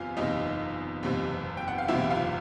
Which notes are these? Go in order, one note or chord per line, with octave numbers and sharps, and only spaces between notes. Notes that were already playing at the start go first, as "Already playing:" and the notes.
Already playing: F#1 E2 C3 F4 F5 G#5
F#1 E2 C3 D#4 D#5
F#1 E2 C3
G5
F#5
F5
F#1 E2 C3 E4 E5
F4 F5